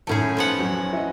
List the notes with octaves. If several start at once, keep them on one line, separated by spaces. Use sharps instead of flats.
A2 D#3 F#3 C#4 G#4 A5
F3 B3 F#5
E2 F#3
E4 D#5